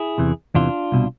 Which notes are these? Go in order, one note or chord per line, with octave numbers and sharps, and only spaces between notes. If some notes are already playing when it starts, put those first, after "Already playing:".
Already playing: E4 G#4
E2 C3 E3
E2 C3 E3 D4 F4
C2 B2